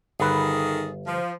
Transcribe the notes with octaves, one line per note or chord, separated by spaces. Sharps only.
G1 D#3 G#4 A4 B4
F3